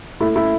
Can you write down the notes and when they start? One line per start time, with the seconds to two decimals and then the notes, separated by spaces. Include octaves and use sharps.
0.20 A3 E4
0.36 E4